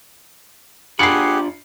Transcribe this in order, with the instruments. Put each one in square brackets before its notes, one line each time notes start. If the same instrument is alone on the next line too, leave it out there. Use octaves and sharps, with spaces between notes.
[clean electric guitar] D4 F4 B5 [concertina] G4 [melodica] G#4 F#5 [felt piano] C7 C#7